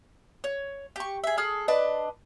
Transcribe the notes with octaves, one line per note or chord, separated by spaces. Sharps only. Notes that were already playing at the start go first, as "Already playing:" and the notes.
C#5
G4 C#6
G#4 E5
G#4 A4 F6
D4 B4 D#5 A5